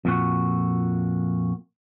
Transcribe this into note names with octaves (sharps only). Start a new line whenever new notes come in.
F2 A#2 F#4